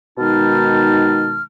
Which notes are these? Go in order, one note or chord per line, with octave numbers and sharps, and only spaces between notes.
B2 D#3 G#3 D#4 A5 F6